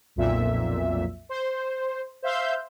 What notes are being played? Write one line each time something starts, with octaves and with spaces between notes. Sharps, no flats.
B1 F2 A#2 E5
C5
C5 E5 F5 C6 E6 G6